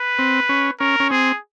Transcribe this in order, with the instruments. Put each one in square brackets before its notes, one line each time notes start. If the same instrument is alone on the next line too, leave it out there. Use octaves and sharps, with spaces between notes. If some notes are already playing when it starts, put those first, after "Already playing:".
Already playing: [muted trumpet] B4
[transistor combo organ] C4
C#4
[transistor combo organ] C#4 [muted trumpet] A#4
[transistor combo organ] C#4
[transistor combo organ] C4 [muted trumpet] G#4